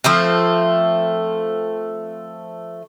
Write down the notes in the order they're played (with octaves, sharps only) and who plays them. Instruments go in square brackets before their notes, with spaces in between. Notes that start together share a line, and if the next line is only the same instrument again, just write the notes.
[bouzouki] F3 A3 C4